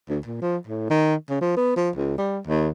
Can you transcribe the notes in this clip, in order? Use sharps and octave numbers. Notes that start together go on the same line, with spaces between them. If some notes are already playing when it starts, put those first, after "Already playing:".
D2
A#2
F3
A2
D#3
C#3
F3
B3
F3
C#2
G3
D#2